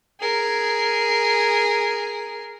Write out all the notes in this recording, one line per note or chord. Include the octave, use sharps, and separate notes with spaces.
G#4 A#4